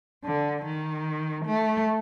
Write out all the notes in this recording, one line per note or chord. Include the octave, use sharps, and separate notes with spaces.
D3
D#3
A3